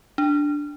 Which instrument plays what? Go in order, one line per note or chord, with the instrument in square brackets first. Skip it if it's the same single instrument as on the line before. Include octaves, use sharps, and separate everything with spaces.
[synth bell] D4